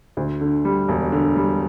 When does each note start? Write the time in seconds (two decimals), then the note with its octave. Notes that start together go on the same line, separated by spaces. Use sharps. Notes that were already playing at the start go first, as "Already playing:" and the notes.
0.17 D2
0.41 D3
0.65 G3
0.88 E1
1.12 D3
1.36 G3